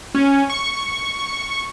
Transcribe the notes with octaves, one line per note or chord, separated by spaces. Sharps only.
C#4
C#6